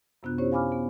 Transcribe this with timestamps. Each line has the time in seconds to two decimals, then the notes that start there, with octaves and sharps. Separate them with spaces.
0.23 F#2 C3 B3 D4 F4 F#6
0.38 C#4 E4 G4 C5 C#5
0.52 F5 G#5 B5 D6 F6
0.72 B3